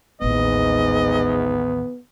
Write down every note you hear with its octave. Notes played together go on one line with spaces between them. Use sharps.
A1 D#2 G#2 B3 D#5